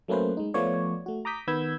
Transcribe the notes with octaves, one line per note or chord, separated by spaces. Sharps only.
F#3 A3 A#3 C#4 B4 C5
G#3 D#4
F3 A3 B3 F4 C#5 D5
A3 F#4
A#5 D6 D#6 G6 B6
D#3 B3 B5 E6 G6 G#6